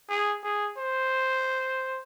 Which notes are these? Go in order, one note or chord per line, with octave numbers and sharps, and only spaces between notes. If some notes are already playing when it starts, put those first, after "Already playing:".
G#4
G#4
C5